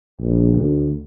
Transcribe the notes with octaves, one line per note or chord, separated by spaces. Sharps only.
A#1
D2